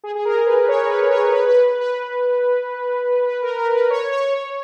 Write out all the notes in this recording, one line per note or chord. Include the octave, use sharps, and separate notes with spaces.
G#4
G#4
A#4
B4
C#5
B4
C#5
B4
B4
B4
B4
B4
A#4
A#4
B4
C#5
C#5
C#5